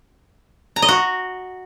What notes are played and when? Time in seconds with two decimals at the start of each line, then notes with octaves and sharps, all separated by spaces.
0.76 A#5
0.82 D#5
0.89 F#4